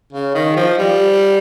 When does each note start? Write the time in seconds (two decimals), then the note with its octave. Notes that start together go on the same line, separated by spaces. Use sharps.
0.13 C#3
0.35 D#3
0.56 F3
0.78 G3